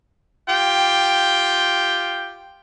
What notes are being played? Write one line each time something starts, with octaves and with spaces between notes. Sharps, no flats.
F4 G4 G5